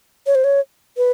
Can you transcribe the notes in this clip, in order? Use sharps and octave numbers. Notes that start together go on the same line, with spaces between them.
C#5
C5
C#5
B4